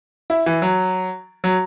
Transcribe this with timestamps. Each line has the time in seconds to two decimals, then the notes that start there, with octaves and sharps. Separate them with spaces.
0.30 E4
0.46 E3
0.62 F#3
1.44 F#3